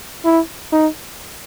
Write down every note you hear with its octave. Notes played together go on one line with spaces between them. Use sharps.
E4
D#4